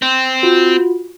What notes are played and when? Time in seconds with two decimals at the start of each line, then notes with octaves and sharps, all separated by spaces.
0.02 C4
0.43 F4 F#4